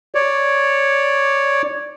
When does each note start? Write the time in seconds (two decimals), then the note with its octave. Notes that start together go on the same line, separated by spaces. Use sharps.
0.15 C#5 D5